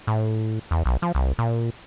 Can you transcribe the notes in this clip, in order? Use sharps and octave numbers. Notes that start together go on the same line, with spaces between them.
A2
E2
B1
F3
C2
A#2